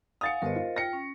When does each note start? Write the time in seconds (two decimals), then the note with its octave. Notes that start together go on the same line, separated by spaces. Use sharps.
0.21 F5 F#5 G#5 D#6 A6 C#7
0.42 G1 A#4 C5 D#5
0.56 F4
0.76 F4 G5 A#6 C#7
0.93 C#4